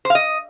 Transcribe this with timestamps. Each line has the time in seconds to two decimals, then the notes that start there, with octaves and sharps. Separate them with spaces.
0.05 C5
0.10 F5
0.15 D#5